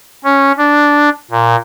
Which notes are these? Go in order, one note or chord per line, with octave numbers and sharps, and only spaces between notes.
C#4
D4
A#2